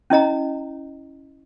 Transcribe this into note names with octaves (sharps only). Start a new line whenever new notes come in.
C#4 E4 D#5 A#5